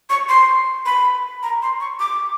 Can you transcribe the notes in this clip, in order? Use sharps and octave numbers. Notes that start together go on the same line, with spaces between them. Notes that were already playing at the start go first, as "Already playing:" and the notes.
C#6
C6
B5
A#5
C6
C#6
D6